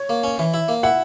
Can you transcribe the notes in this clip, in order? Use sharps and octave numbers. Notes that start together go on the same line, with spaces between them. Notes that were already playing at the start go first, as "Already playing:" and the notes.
Already playing: C#5
A#3
C#4
E3
E4
A#3
E4 F#5